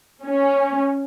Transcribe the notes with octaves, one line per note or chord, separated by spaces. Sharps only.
C#4